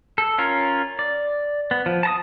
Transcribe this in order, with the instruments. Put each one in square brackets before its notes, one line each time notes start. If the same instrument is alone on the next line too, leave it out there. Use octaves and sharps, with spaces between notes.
[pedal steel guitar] A4
C#4 F4 A#4
D5
B3
F3
A5 A#5 D#6